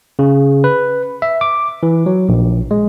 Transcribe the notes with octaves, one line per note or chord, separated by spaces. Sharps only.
C#3
B4
E5
D6
E3
F#3
A#1
G#3